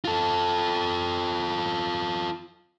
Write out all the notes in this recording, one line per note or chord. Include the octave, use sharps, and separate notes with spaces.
F4 A4